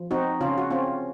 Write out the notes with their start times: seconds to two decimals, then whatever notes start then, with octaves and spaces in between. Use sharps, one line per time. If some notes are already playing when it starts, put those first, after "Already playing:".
Already playing: F3
0.11 C4 D#4 F#4
0.40 C#3 C#4 F4
0.58 F#4
0.70 C4 C#4 F4